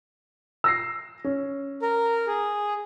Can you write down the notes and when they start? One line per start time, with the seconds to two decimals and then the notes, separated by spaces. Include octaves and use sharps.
0.64 E6 A#6 C7
1.24 C#4
1.82 A#4
2.27 G#4